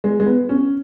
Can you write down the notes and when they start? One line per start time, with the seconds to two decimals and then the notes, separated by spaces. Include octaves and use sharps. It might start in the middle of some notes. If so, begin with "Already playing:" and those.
0.04 G#3
0.20 G#3
0.26 B3
0.49 C#4